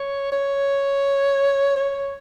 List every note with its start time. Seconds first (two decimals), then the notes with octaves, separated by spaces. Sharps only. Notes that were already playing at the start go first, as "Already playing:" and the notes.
Already playing: C#5
0.32 C#5
1.76 C#5